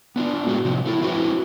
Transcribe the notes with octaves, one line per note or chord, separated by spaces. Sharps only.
B3 D4 F4
A2 G#3 A3 F#4
C3 F3 G3 C4
A3 E4 A4
F3 C4 E4 F#4 A#4 B4